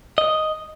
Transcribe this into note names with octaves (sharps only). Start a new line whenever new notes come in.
D#5